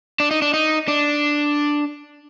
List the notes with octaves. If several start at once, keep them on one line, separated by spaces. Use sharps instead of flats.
D4
D#4
D4
D#4
D4